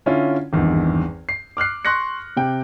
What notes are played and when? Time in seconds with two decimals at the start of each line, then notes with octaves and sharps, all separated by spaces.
0.06 D3 C#4 E4 F4
0.53 G#1 E2 G2
1.29 C7
1.57 D6 F6 F#6 C7
1.85 C6 C#6 F#6 A#6 C#7
2.36 C3 G5